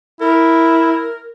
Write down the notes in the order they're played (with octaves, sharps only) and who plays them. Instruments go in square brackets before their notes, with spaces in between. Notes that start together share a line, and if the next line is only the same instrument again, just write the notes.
[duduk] E4 [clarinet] A#4